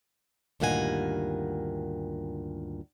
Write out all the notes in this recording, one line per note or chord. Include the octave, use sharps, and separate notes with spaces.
D2 G2 A#2 D#3 F#5 G#5